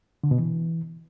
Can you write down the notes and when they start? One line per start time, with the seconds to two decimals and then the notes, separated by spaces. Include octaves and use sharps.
0.24 D3
0.31 B2
0.39 E3